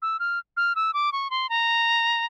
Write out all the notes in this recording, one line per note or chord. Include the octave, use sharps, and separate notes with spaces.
E6
F6
F6
E6
D6
C#6
C6
A#5